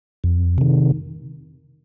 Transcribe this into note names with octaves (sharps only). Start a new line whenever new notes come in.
F2
C3 D#3